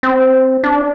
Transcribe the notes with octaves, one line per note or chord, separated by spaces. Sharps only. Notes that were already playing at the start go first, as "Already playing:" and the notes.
C4
D4